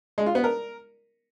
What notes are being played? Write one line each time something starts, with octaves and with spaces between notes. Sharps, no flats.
G#3
F4
B3
A#4